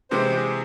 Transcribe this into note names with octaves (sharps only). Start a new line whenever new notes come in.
C3 E3 G#3 C4 G4 C5
G#4